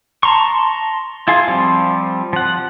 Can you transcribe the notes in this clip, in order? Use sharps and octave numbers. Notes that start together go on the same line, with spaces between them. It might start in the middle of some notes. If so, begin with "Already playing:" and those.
A5 A#5 C6 C#6
E4 F4 G#4
F3 G3 C4
F3 F#5